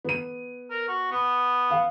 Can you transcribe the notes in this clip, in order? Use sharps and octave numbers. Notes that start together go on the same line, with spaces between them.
B3 D#7
A#4
F#4
B3
F5